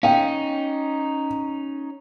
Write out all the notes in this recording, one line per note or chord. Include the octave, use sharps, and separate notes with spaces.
C#4 D#4 F5 G5